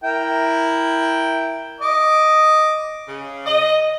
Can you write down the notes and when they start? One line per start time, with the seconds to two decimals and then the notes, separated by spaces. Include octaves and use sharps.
0.04 E4 A#4 G5
1.80 D#5 D6
3.07 C#3
3.46 D#5